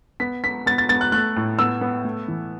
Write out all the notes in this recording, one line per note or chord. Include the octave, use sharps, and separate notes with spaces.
B3 B6
B3 B6
B3 A6
A6
B3 A6
F#6
A3 F#6
A2
B3 E6
B3
A3
E3